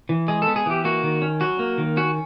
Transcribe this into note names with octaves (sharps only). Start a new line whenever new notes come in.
E3
G#3 G#4
B3 A4
G#4
E3 G4
A#3 F#4
D#3
C#4
F#3 F#4
A#3
D#3
C#4 F#4